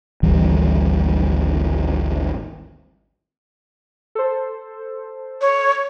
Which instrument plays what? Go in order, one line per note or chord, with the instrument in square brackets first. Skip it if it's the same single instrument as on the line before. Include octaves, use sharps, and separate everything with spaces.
[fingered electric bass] G#1 D2 E3 G3
[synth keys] A4 C5
[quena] C#5